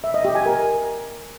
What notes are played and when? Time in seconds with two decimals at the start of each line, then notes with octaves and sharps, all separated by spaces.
0.04 E5
0.14 D#5
0.25 G4
0.35 G#5
0.46 A#4